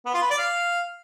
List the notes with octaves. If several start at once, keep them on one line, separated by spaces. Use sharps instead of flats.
B3
F4
B4
D5
F5